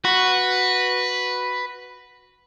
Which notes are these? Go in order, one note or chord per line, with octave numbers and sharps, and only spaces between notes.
F#4 B4